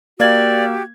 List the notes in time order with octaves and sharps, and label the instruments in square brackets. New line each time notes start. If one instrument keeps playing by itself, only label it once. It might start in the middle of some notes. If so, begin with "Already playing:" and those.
[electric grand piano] A#3 F5 G#6 [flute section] F#4 G4 E6 [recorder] D5